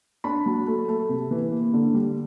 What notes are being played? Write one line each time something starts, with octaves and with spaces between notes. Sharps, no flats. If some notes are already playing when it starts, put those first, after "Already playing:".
D4 B5
F#3
A3
A3
C3
E3
A#3
D3
G3